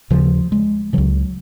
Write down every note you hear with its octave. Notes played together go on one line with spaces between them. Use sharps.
D#2 C#3 F3
G#3
C#2 C#3 F#3